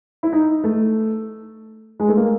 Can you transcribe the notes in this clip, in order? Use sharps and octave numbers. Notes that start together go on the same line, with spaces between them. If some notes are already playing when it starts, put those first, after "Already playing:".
E4
D#4
A3
G#3
A3
A#3